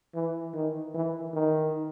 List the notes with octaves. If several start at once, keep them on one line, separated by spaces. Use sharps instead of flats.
E3
D#3
E3
D#3